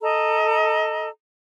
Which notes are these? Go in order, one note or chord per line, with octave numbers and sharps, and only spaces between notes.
A4 D#5 A#5